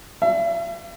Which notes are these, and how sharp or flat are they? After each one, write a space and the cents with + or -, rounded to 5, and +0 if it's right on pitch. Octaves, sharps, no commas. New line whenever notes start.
E5 +40